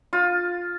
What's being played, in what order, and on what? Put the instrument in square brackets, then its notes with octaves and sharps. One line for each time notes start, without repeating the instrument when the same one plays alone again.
[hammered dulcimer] F4